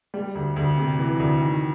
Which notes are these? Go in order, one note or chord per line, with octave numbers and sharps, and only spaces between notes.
G3
D2
D2
C3
E3
D2
D#3